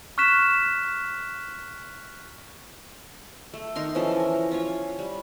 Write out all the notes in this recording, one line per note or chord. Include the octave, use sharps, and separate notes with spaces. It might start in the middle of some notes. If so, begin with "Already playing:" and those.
C#6 F6 F#6 B6 E7
A3
D#3 D#4 A#4 C6
E3 F3 C#4 A4
A#4
C#4 F4 C#5
G3